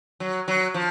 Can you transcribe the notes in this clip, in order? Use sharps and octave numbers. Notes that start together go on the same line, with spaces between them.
F#3
F#3
F3